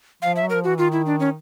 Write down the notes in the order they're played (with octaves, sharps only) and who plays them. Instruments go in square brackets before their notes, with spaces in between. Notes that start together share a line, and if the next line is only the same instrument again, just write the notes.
[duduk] F3 [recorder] F5
[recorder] E5
[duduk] F#3
[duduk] F3 [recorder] A#4
[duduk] E3 [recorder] F#4
[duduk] D#3 [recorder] F4
[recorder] E4
D4
C#4